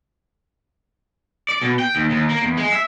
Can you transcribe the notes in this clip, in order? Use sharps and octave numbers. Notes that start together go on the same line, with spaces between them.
D5
B2
G5
D#2
D#2
A#3
E2
G#3
E5